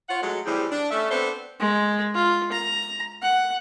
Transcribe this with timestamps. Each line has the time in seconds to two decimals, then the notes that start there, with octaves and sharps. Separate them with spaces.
0.09 F4 C#5 F#5
0.22 F#3 G#3 A3
0.46 A2 E3 G3 C4 G4 G#4
0.72 D4
0.91 A3 C#4 E5
1.10 B3 C4 D4 A4 C5
1.60 G#3
2.15 F4
2.52 A#5
3.22 F#5